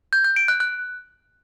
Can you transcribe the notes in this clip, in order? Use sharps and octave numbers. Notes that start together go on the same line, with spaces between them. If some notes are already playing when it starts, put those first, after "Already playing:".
G6
G6
D7
F#6
F#6